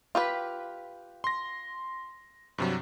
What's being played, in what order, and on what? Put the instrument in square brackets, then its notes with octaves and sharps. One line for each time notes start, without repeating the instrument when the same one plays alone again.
[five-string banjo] F4 G4 B4
[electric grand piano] C6 A#6
G2 C3 F#3